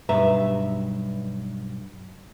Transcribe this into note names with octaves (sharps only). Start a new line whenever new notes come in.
B1 G2 B4 E5 A#5